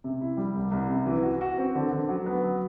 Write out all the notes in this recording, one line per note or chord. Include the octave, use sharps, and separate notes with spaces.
C3
E4
G3
C2
C2
C3
E3
F#4
F#4
C4
D3
D3
F#3
B3
F#3